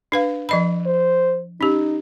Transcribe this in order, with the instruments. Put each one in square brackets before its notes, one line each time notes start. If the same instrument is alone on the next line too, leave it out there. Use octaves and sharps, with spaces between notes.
[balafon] D4 B4 F5
F3 D#5 B5
[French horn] C5
[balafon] C#4 G4 [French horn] D#4